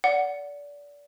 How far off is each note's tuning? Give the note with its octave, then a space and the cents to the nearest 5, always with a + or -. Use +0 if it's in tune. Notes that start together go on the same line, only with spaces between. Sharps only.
D5 -25 F#5 +0